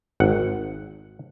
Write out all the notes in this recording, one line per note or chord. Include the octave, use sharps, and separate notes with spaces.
G#1 F#5